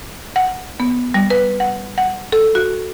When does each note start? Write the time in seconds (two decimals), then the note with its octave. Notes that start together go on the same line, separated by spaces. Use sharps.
0.36 F#5
0.80 B3
1.14 G3
1.30 B4
1.60 F#5
1.98 F#5
2.32 A4
2.55 F#4